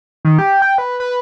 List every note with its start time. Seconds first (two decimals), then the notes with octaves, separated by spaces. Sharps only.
0.25 D#3
0.38 G4
0.62 G5
0.78 B4
1.00 B4